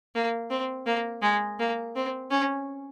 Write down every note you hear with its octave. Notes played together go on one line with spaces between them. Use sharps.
A#3
C4
A#3
G#3
A#3
C4
C#4